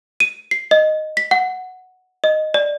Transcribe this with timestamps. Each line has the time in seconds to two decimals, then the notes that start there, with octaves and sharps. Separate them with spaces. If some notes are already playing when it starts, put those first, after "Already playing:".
0.20 D#7
0.51 C7
0.71 D#5
1.17 B6
1.31 F#5
2.24 D#5
2.54 D5